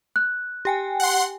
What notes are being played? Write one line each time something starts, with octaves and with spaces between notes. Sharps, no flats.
F#6
G4 G5 G#5
F#5 C6